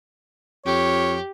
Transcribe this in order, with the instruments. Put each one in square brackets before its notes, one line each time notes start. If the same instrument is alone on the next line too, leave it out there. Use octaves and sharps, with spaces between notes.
[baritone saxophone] F2 [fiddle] G4 [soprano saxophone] C#5